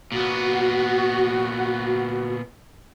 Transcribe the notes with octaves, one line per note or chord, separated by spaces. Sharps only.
A#2 B3 F#4